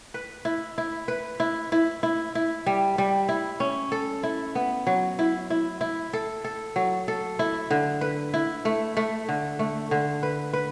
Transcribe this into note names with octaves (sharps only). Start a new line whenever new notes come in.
B4
E4
E4
B4
E4
E4
E4
E4
G3
G3
E4
C#4
A4
E4
B3
F#3
E4
E4
E4
A4
A4
F#3
A4
E4
D3
B4
E4
A3
A3
D3
A3
D3
B4
B4